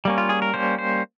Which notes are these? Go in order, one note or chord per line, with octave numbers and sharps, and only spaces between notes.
G3 A#3 C#4
F4
G#4
A#4
G3 A#3 C#4 C5
C5